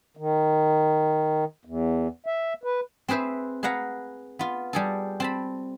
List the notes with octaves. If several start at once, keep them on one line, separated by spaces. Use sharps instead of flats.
D#3
E2
E5
B4
C4 G#4 B4 C5 E5
G#4 B4 F5 F#5 A#5
B3 F4
G3 G#4 A4
C4 A5 B5